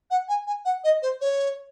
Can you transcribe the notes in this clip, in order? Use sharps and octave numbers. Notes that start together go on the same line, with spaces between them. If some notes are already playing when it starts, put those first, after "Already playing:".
F#5
G#5
G#5
F#5
D#5
C5
C#5